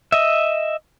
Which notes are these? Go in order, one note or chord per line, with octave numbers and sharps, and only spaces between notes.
D#5 E5